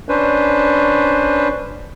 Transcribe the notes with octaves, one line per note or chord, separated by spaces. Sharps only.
C#4 D4 B4 C5